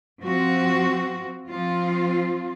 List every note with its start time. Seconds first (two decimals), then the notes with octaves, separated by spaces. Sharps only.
0.21 F3 C4 F#4
1.49 F3 C4 F4